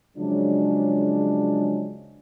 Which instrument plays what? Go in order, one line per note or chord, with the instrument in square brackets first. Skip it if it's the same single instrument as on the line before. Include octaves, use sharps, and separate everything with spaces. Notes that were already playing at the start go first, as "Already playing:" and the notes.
[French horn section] C#3 F3 F#3 G#3 D4